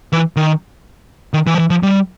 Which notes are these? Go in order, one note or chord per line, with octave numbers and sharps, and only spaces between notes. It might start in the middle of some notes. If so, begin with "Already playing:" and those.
E3
D#3
D#3
E3
F3
E3
F3
G3